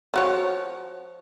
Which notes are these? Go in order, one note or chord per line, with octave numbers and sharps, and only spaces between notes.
F3 F#4 C#5